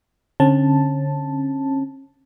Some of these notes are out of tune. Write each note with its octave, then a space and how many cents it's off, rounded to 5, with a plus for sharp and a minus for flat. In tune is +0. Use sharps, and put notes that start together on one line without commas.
D3 -25 C#4 -40 A5 +0